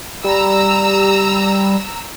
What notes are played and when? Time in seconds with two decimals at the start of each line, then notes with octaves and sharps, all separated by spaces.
0.24 G3 A#5 E6